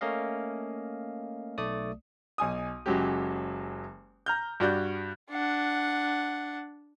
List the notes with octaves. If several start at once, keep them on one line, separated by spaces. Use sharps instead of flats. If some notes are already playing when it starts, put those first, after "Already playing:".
A3 A#3 C#4 D#5 F5
B1 A3 D5 D#6
B1 G#5 D#6
F#1 F#3 G#3 C#4 G4
A#5 F6 G6
G2 F#4 D5 G6
D4 F#5